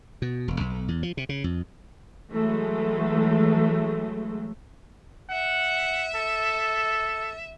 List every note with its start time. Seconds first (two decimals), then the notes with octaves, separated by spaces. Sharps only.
0.22 B2
0.48 E1
0.60 B1
0.88 E2
1.03 F3
1.17 C3
1.29 C#3
1.44 F2
2.31 E3 F#3 G#3 A3
5.30 E5 F#5
6.16 A4